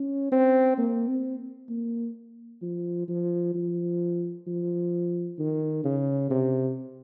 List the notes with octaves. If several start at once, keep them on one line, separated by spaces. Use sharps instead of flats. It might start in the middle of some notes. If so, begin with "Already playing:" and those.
Already playing: C#4
C4
A#3
C4
A#3
F3
F3
F3
F3
D#3
C#3
C3